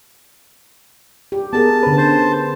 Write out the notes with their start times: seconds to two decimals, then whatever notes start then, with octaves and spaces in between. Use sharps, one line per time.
1.32 G4
1.53 B3 G#4 A#4 A5
1.83 D3 C#4 B4
1.97 C5 A5